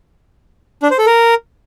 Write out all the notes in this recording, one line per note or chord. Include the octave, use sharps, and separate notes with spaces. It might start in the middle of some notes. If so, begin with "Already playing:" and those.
D4
C5
A4
A#4